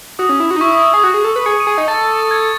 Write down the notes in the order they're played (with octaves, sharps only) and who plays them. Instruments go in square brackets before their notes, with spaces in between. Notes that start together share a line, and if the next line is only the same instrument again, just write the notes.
[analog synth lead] F#4 [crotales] D#6
[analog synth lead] C#4
E4
F#4
D#4
[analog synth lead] E4 [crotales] C#6
[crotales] D#6
C#6
[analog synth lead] G#4 [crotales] D#6
[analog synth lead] F#4 [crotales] D#6
[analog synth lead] G#4
A4
B4
[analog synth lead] G#4 [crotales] C#7
[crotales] D#7
[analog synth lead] G#4
D#4
[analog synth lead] A4 [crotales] A6
[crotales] G#6